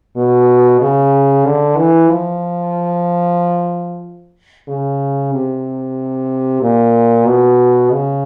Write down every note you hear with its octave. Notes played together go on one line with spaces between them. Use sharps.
B2
C#3
D3
E3
F3
C#3
C3
A#2
B2
C#3